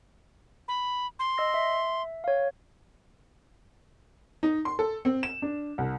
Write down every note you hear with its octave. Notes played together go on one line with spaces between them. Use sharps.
B5
C6
D#5 E6 A#6
E5
C#5 F5
D#4
C6
A4
C4
E7
D4
C2